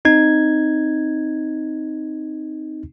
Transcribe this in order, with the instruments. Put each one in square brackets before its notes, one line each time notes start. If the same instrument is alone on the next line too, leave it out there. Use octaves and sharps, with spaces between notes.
[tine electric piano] C4 D#4 G#6